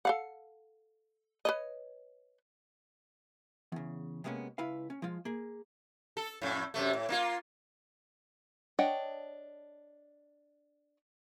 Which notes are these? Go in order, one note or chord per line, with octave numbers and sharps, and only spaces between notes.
A4 F5 F#5
B4 C#5 D#5
E2 C#3
C3 G#3 A#3 B3 C#4
C#2 E4 B4 F5
C#4
F3 G#3 F4
A#3 G#4
A4
F2 A2
F#2 C3 A3
A2
A#3 D4 F4
D4 C#5 D#5 F#5 G5